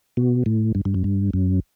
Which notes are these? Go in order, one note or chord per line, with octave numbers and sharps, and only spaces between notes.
B2
A2
G2
G2
F#2
G2
F#2